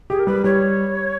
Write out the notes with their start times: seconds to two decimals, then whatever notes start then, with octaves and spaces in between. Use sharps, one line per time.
0.10 G4 G#4
0.19 A#4
0.27 G3 B4
0.44 G3 C#5